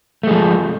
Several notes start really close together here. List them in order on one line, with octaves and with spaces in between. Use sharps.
A3 G#3 F3